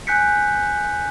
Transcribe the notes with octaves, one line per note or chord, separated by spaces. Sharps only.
G#5 F#6 G6 B6 C#7